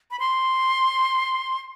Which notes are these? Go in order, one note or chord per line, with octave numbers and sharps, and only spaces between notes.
B5
C6